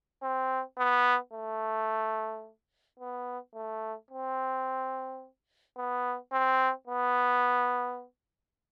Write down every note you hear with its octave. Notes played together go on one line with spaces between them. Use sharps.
C4
B3
A3
B3
A3
C4
B3
C4
B3